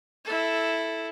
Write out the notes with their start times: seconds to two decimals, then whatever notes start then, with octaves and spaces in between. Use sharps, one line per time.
0.25 E4 A4